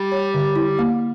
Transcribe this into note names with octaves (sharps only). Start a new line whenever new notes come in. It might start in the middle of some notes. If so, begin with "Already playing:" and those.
Already playing: G3
C#5
D3
E4
A#3